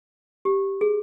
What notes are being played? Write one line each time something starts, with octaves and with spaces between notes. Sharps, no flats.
G4
G#4